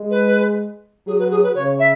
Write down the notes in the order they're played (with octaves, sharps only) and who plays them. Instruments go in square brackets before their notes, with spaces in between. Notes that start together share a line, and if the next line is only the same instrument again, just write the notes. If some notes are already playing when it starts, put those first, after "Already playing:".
Already playing: [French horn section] G#3
[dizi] B4
[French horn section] F#3 [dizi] G#4
[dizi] B4
G#4
B4
[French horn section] C#3 [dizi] C#5
[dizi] E5